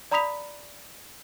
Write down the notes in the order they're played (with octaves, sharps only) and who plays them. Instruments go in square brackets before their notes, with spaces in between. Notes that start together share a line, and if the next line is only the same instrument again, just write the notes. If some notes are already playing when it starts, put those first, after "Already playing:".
[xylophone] D5 A#5 B5 D#6 B6 F7